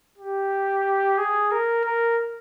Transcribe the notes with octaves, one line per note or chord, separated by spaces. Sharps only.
G4
G#4
A#4
A#4